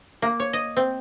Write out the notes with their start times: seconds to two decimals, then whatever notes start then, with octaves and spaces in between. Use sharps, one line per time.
0.22 A#3
0.40 C#5
0.53 D#5
0.77 C4